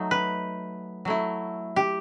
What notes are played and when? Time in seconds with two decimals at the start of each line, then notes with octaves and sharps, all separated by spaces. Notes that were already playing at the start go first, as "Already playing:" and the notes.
Already playing: F#3 A3 D#4
0.11 B4
1.05 F#3 A3 E4
1.76 G4